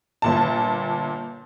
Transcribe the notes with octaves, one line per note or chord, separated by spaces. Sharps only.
G1 A#2 A5